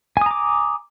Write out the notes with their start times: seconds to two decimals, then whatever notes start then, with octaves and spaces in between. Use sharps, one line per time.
0.17 G#5
0.21 D#6
0.26 A#5
0.31 D6